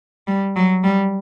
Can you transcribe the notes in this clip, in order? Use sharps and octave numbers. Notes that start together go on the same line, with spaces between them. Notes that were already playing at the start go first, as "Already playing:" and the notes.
G3
F#3
G3